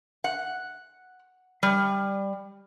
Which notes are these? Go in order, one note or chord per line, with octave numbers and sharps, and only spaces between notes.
F#5
G3